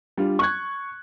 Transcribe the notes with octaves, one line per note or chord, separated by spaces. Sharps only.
G3 D4 F4
C#6 F#6 G#6